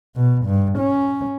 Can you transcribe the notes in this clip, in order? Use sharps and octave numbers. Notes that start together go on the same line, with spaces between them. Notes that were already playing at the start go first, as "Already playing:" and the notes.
B2
G2
C#4